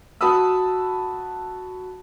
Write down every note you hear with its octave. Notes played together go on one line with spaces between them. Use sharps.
F#4 A5 B5 D#6 E6